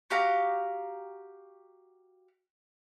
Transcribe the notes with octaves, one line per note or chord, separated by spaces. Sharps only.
F#4 G4 F5 A#5